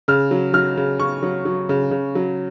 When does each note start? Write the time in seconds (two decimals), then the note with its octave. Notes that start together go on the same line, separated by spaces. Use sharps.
0.08 C#3 F6
0.31 F#3
0.53 F#3 F6
0.77 C#3
1.00 C#3 C#6
1.23 F#3
1.45 F#3
1.69 C#3
1.91 C#3
2.15 F#3